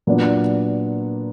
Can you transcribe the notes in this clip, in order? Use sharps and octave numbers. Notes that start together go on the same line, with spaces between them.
A#2 F#3 B3 D4